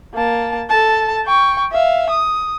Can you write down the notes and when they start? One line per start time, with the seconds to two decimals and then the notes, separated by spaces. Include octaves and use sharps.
0.15 A#3 A5
0.70 A4 A5
1.26 G5 C#6
1.72 E5 F5
2.10 D#6